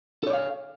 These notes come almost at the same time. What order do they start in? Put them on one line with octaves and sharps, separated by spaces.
A4 C#5 D5 F5